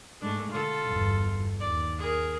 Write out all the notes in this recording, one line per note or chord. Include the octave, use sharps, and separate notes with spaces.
G#2 G#3 A3 D4
D3 F4 A4
G1 E2
D#2 D5
G#4 A#4